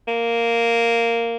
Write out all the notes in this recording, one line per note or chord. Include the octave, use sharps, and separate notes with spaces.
A#3